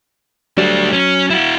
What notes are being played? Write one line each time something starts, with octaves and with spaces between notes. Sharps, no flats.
F#3 G3 A3 D4
F#3 C#4
E4 F#4